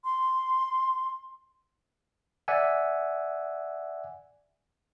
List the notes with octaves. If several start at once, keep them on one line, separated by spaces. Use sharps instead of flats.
C6
D5 E5 F#5 G#5